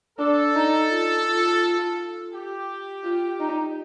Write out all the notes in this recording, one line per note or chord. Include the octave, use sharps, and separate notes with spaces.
D4 A4
D#4
F4
F4
G4
F4
D#4